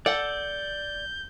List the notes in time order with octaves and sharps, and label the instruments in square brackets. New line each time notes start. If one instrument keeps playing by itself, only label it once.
[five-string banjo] A4 F#5 [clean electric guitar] D5 [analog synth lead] G6